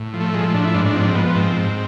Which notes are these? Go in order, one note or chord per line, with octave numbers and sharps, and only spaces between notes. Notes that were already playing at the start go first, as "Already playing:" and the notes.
Already playing: A2
F3
A3
F3 G#3
A3
A2 D4
E4
G#2 D4
D4
F3 C4
D4
C4
F3 B3
B3
G#2 C4
G#2